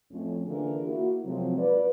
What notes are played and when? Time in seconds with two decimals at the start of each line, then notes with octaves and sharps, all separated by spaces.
0.12 F2 A2 C#4
0.48 D3 E3 A#3 F4 G#4 A#4
0.86 A#3 E4 F#4
1.25 C3 F3 F#3 G#3 C4
1.57 F4 B4 D5